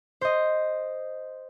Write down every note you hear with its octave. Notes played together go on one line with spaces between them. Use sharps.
C5 D#5